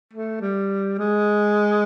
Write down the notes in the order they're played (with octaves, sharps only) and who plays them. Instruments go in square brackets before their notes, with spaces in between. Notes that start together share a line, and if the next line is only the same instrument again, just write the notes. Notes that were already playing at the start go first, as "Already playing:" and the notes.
[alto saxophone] A3
G3
G#3